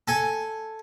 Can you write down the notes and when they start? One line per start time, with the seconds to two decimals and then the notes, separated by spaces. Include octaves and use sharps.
0.08 A4 G#5